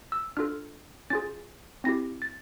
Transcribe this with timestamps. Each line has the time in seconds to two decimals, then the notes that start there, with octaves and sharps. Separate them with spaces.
0.12 E6
0.37 D4 F4 A4 F6
1.10 C#4 F4 G#4 A6
1.84 C4 E4 G4 A#6
2.22 A6